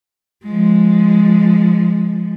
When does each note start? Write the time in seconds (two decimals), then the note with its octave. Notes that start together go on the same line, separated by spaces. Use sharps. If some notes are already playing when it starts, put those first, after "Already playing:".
0.44 F3 G#3